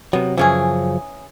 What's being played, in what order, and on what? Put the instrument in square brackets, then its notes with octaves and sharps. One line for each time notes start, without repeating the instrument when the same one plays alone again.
[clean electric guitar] C3 F#3 [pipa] B3
[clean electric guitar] F#2 C#3 F3 [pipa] E3 C#4 G#4